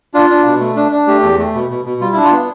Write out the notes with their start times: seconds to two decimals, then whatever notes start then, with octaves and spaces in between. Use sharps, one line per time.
0.14 D4 F4
0.30 D4
0.45 B2
0.61 A3
0.76 D4
0.92 D4
1.07 A3 G4
1.23 E2
1.38 A3
1.54 B2
1.70 B2
1.85 B2
2.01 G3 F4
2.13 D4 E4
2.24 F4
2.32 B3